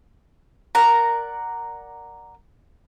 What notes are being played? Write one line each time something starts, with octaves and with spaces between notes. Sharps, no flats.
A#4 D5 F#5 A#5